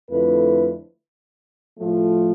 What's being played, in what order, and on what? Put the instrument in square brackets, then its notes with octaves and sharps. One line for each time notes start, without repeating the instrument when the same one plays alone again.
[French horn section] F2 D3 A3 E4 B4
A2 F3 A3